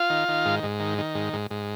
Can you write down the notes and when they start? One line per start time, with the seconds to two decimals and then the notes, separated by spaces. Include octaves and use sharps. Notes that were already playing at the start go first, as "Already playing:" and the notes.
Already playing: F4 F5
0.10 D#3
0.28 D#3
0.45 G#2
0.63 G#2
0.80 D#3
0.98 D#3
1.15 G#2
1.33 G#2
1.51 G#2